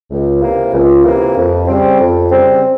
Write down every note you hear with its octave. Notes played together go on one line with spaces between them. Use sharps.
C#2
C3 E3 A#3
C#2
C3 E3 A#3
F2
C#3 G3 C4
F2
C#3 G3 C4